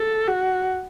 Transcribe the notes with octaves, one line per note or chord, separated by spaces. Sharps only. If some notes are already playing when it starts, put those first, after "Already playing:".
Already playing: A4
F#4